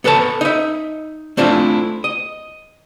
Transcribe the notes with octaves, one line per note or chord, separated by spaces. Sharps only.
B3 A4 B4 C#5 A5
D#4 E5
A3 C4 D4 E4 F4
D#5